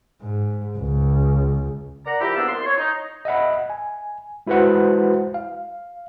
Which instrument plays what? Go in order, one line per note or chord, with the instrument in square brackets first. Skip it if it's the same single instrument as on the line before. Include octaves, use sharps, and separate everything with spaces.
[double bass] G#2
C#2
[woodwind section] A#4 D5 F#5 A#5
F3 E4 G4
E2 A#3 B3 D4 E6
C2 C6
C#5
D#4
[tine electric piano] D#5 E5 F#5 B5
G#5
G#3 E4 F#4 B4 C5 F#5
F5